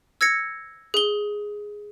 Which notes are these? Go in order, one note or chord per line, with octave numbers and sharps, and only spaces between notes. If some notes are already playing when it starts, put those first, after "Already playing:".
E6 G#6 A#6 C#7
G#4 G7